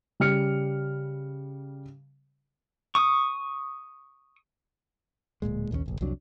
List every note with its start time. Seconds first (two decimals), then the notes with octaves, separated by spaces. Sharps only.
0.20 C#3 G3 F6 C#7
2.95 C#6 D#6
5.42 D1 E2 A#2 G#3
5.71 A#1 D#2 G3 C#4
5.86 F1 A#1
6.01 C2 F2 F#3 D4